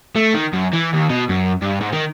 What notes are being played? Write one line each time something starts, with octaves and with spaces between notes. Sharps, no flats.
A3
D#3
F#2
E3
D#2
B2
F#2
G2
G#2
D#3